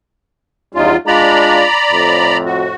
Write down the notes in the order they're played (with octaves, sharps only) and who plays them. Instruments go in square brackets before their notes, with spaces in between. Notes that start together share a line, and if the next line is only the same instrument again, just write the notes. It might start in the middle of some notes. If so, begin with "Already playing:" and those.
[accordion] E2 F4 [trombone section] G3 C#4 D#4
[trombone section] G#3 D4 F4 [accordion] D5 A#5 B5
[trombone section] F2 A2
[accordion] F#4